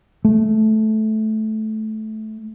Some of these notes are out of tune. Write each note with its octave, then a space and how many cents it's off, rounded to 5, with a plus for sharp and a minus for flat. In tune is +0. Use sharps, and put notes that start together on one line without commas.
A3 -15